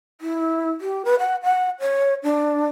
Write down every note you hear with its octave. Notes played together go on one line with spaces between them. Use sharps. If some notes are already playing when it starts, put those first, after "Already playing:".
E4
G4
B4
F#5
F#5
C#5
D4